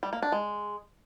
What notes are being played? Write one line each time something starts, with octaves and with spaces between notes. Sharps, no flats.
G3
A#3
D4
G#3